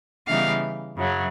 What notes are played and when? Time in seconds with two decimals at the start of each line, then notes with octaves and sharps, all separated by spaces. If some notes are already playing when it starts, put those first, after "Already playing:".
0.27 C#3 E3 G3 B3 D#4 F5
0.97 F#2 C#3 F#3